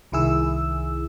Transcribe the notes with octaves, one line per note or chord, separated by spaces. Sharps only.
C2 D#3 E4 G#4 E6